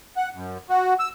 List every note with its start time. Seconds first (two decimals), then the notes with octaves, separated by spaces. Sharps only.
0.17 F#5
0.35 F#2
0.70 F#4
0.99 E6